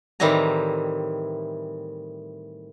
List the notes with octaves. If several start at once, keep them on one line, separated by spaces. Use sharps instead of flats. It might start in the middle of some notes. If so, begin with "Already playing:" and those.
A2 D#3 E3 G3 C4 A#5